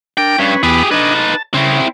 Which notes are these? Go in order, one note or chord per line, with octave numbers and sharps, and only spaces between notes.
D4 A#4 G5
G2 C#4 B4
E2 B3 G4 G#4 B5
D4 D#4 B4 D#5 G#5
A5
C#3 C4 E4